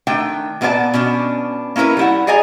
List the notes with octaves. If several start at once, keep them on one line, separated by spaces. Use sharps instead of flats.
D#3 A3 D4 G5
A#2 A3 B3 F4 D5 A5
B2 C#4 D4
A#3 C#4 E4 A#4 B4
G3 E4 F#5
G#4 D5 D#5 G#5 A#5